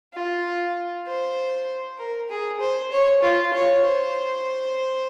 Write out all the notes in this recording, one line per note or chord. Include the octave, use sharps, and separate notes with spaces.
F4
C5
A#4
G#4
C5
C#5
F4
C#5
C5